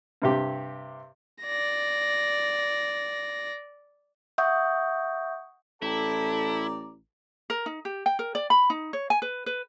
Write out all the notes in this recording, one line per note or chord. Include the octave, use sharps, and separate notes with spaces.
G2 C3 G4
D5 A#6
E5 F#5 C#6 D#6 G6
A1 E4 A4 D5 G5 A#5
A#4
D#4
G4
G5
A#4
D5
B5
D#4
C#5
G#5
B4
B4